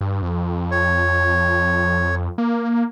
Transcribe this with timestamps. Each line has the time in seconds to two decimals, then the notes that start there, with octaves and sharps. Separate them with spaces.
0.01 G2
0.22 F2
0.71 C#5
2.38 A#3